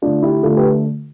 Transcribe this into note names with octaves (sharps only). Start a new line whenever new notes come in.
D3 A3 D4 F4
E4 G4
D3 A3 F4 A4
G4 B4